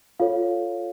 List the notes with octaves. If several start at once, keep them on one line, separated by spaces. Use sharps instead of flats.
F4 A4 C#5 F5